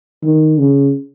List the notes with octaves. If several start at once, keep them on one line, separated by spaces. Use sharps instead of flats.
D#3
C#3